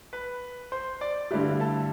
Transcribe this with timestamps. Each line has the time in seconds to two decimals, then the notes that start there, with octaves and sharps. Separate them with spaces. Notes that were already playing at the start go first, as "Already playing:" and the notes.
0.13 B4 B5
0.72 C5 C6
1.01 D5 D6
1.31 G2 D3 A3 E4 G4 B4 B5
1.60 A4 A5